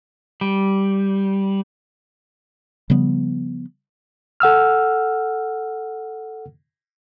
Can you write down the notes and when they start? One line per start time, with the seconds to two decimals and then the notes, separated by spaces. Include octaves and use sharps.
0.41 G3
2.90 C#3 F3 G3 B3
4.40 A4 F#5 E6 F6